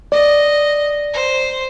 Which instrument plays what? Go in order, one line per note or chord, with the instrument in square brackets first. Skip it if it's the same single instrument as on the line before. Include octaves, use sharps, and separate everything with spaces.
[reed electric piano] D5 [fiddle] D#5
[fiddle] C5